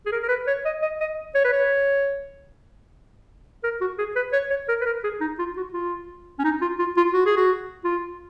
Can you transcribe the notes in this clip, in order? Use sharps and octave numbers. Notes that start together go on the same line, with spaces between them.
G#4
A#4
A#4
B4
C#5
D#5
D#5
D#5
C#5
B4
C#5
A#4
F#4
G#4
B4
C#5
C#5
A#4
B4
A#4
G#4
D#4
F4
F#4
F4
C#4
D#4
F4
F4
F4
F#4
G#4
F#4
F4